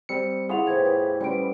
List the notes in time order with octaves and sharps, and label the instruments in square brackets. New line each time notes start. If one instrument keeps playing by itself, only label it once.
[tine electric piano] G3 C4 C#7
[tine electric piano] E4 F4 G#4 [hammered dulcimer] C#5 [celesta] F#5 F7
[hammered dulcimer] A2 B3 G4 [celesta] C5 G5 G#6
[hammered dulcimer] E3 B4
[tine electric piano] G3 C#4 [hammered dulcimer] B3 C5 [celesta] G5 D7